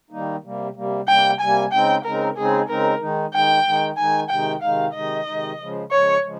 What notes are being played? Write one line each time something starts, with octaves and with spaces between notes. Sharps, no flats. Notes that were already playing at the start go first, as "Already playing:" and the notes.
D#3 G3 A#3 D#4
C3 G3 A#3
C3 G3 A#3
C3 G3 A#3 G5
C3 G3 A#3 G#5
C#3 G#3 C4 D#4 G5
C#3 G#3 C4 D#4 A#4
C#3 G#3 C4 D#4 G#4
C#3 G#3 C4 D#4 A#4
D#3 G#3 D#4
D#3 G#3 D#4 G5
D#3 G#3 D#4
D#3 G#3 D#4 G#5
C3 D#3 G#3 D#4 G5
C3 D#3 G#3 D#4 F5
C3 D#3 G#3 D#4 D#5
C3 D#3 G#3 D#4
C#3 F3 G#3
C#3 F3 G#3 C#5
C#3 F3 G#3